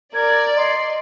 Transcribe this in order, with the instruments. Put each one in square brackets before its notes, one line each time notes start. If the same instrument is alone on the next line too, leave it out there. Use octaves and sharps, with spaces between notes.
[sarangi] A#4 [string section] D5 [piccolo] G#6
[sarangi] D#5 [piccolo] C6